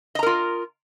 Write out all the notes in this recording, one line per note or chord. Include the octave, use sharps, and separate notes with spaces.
F4 A#4 D#5 A#5